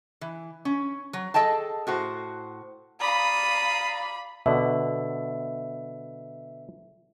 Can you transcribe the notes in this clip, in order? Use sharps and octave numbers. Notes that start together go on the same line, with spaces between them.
E3
C#4
F#3
G#4 A4 D#5 G5 A5
A2 F#4 C5
D5 F5 A#5 B5 D#6
B2 D3 E5